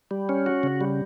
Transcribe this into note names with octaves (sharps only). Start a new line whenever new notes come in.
G3
C#4
F#4
C#3
G3